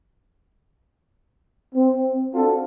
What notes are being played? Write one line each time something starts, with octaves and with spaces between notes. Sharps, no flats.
C4
C4 D4 F4 F#4 A4